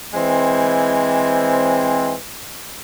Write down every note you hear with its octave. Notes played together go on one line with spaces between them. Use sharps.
E3 G#3 C4